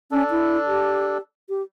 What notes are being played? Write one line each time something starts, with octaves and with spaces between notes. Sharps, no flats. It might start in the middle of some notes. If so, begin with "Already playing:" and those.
C#4 D4 A4
E4
G4
G4